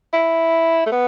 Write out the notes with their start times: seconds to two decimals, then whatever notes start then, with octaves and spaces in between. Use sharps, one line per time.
0.13 E4
0.86 A3
0.92 B3